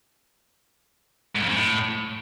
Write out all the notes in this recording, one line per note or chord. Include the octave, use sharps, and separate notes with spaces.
G#2
F2
G#2
A2